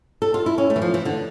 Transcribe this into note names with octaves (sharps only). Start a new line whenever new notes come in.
A4
F4
E4
C#4
A3
E3
F3
E3
D3